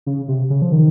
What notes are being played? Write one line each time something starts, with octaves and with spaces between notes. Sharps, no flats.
C#3
C3
C#3
F3
D#3